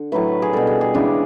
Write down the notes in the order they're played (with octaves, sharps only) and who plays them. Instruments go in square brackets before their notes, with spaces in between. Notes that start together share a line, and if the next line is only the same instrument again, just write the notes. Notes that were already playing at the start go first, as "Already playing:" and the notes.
Already playing: [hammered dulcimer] D3
A2 F#3 A3 B4
G#4
B2 G3 A4
G#4
G#4
C#3 E3 G#3 D4